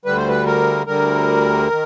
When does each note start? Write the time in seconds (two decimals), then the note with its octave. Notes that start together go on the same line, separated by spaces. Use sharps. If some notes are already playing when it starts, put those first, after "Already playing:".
0.05 D2 D3 G3 B4
0.17 C5
0.28 B4
0.46 A#4
0.87 D2 D3 G3 A#4
1.70 D#3